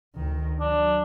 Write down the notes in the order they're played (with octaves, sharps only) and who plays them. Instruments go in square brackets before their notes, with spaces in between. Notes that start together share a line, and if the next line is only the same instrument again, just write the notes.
[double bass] D2 D#3
[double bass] F#3 [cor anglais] D4